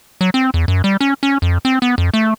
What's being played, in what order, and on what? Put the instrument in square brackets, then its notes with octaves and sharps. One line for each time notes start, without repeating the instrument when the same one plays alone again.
[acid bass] F#3
C4
E2
F#2
G3
C#4
C#4
F2
C4
B3
F2
A3